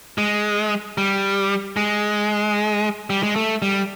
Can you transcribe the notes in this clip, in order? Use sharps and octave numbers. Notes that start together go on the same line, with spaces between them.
G#3
G3
G#3
G3
G#3
A3
G3